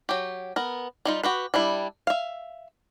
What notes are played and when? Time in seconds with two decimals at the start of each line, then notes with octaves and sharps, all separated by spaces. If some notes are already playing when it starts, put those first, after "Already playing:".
0.09 F#3 G4
0.56 B3 A#4
1.05 G3 D#4 F4
1.23 F#4 G4 B4
1.54 G3 D4 E4
2.07 E5 F5